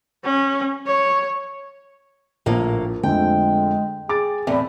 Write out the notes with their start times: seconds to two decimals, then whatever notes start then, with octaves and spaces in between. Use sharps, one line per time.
0.25 C#4
0.87 C#5
2.46 A#1 A2 A#3
3.03 F2 D3 G#3 A3 G5
4.09 G#4 D6 A6
4.47 E2 A2 C4 D5 B5